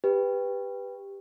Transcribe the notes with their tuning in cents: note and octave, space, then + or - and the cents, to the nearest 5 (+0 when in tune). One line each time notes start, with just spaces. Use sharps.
G4 +15 B4 +0